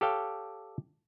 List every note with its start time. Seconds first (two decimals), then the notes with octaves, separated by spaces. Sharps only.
0.01 G4 A4 C#5 F5 G5